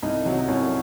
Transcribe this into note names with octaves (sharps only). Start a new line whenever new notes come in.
C2 D#4
C3 F#3
C2 C#4